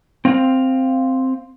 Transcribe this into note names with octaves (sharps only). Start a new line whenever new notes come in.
C4 F5